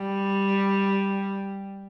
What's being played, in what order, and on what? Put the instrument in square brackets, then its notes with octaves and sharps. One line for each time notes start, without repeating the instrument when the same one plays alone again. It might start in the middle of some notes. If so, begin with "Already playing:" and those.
Already playing: [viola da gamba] G3